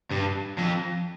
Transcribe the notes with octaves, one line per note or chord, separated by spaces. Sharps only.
G2
F2